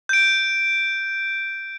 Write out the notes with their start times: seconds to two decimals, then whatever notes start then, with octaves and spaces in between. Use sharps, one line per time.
0.09 G6 D7